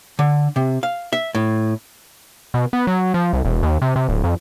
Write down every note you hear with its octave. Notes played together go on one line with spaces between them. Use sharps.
D3
C3
F5
E5
A2
B2
B3
F#3
F3
C2
E1
D#2
C3
C3
D1
F2